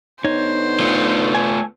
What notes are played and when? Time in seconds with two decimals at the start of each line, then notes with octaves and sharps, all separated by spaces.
0.24 D2 D3 B3 D#4 C5 C#5
0.80 A3 F4
1.35 G#5